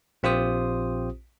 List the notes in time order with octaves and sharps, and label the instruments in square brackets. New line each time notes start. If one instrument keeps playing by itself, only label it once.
[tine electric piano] A#1 C4 F4 G4 C5 D#6